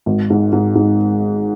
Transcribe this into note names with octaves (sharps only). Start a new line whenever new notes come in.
G#1
G#2
G#2
G#2